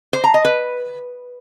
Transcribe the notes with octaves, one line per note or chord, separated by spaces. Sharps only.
C5
A#5
D#5
B4